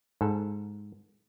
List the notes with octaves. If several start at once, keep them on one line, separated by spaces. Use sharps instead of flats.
G#2 A4